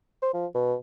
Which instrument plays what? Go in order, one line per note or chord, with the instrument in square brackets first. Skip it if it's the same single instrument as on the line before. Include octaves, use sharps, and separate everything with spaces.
[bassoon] C5
F3
B2